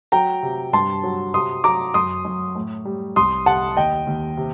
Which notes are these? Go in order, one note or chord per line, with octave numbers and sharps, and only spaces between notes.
F#3 G5 A#5
C3
G2 A5 C6
F#3
C3 C6 D#6
F#3 A#5 D6
F#2 C6 D#6
F#2
A2
G3
C2 C6 D#6
C3 F#5 A5
D#2 D#5 G5
D#2
C3